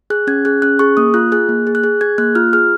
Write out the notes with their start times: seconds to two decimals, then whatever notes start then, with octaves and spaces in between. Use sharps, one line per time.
0.10 G#4 F#6
0.27 C#4 G#6
0.45 G#4 F#6
0.62 C#4 F#6
0.79 G#4 C#6
0.97 A#3 D#6
1.14 F4 F#6
1.32 G#4 F#6
1.49 A#3
1.67 G#4
1.75 F#6
1.84 G#4
2.01 G#4 G#6
2.18 A#3 F#6
2.35 F4 F6
2.53 G#4 F6